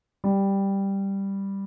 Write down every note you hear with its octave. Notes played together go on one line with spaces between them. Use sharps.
G3